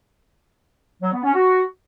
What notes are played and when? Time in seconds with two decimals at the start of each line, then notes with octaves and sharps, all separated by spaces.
1.02 F#3
1.13 B3
1.24 C#4
1.34 F#4